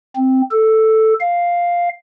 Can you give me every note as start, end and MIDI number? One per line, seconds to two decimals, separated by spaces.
0.16 0.42 60
0.51 1.14 69
1.20 1.89 77